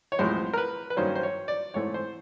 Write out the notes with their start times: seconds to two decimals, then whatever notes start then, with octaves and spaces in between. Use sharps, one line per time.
0.12 C#5
0.19 B1 A2 F3 G#3 C4 C5
0.53 A#4
0.58 B4
0.90 B4
0.97 G2 D#3 F#3 A#3 C#4 C5
1.15 C5
1.23 C#5
1.48 D5
1.74 G#2 E3 A3 C4 C#5
1.94 C5